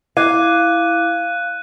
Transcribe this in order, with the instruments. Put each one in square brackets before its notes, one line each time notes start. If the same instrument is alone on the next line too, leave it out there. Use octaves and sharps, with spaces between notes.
[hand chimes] E4 D6 G#6 [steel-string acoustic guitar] F5 [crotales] F#6 D#7